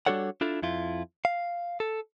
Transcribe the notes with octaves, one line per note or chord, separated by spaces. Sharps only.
G3 D4 F#4 A4 C#5 F#5
D4 E4 F4 A4
F2 E4 F4
F5
A4